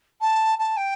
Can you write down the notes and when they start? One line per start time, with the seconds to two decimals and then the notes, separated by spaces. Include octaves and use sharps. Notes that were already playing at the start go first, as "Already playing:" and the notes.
0.21 A5
0.58 A5
0.76 G5